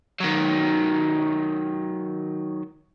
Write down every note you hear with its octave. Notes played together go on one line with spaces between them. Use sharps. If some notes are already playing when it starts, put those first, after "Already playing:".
D#3 F#3